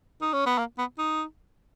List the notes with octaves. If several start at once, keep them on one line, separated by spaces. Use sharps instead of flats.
D#4
C#4
B3
A#3
B3
D#4